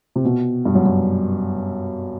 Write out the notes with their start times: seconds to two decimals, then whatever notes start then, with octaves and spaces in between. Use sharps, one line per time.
0.16 C3
0.25 B2
0.65 G2
0.75 F#2
0.86 F#2